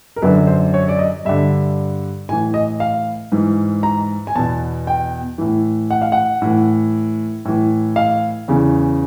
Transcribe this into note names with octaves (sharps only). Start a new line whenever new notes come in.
A#4
F#2 D3 B4
C5
C#5
D5
D#5
G2 D3 E5
A2 E3 G#5
D#5
F5
G#2 E3
A#5
G#5
E2 B2 A5
G5
A2 E3
F#5
F5
F#5
A2 E3
A2 E3
F5
E2 C#3 E3